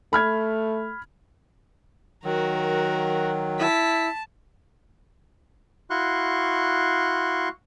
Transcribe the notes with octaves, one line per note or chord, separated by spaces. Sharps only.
A3 B5 F6 G#6
D#3 F#3 F#4 A#4
E4 A5 B6
E4 F#4 F5 C6 C#6 F#6